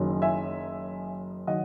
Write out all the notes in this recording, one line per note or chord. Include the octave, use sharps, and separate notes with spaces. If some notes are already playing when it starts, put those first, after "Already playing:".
Already playing: F#1 F#2 D#3 F#3
E5 G#5
D#3 F#3 D#5 F#5